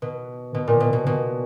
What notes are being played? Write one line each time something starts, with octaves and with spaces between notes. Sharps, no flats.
B2
B2
A#2
B2
B2
B2